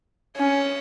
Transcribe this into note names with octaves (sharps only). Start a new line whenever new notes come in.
C#4